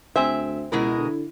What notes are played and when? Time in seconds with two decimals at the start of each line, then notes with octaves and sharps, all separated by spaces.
0.16 D2 C4 G#4 C5 E5
0.72 C#2 B2 G#3 E4 A#4
0.98 D3